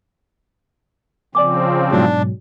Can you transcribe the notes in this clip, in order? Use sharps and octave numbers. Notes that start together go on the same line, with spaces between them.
C#3 F3 C4 D5 G#5 D6
G#2 B2 F#3 D4